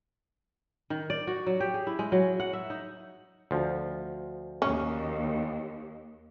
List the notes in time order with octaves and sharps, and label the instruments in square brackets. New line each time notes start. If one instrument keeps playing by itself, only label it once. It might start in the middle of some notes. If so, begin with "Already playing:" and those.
[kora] D#3
D5
F#4
F#3
G4
G#4
E4
G#3
F#3
F#5
E5
D#4
[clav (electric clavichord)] D2 F3
[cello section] D#2 [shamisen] C#4